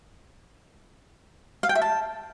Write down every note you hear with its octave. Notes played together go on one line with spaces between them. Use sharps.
F5
G5
E5
A5